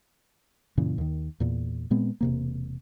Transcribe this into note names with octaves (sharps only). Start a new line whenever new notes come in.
F#2 A#2 C#3 E3
D#2 D#3
E2 A#2
A#2 G#3 B3 C4
E1 C3 A#3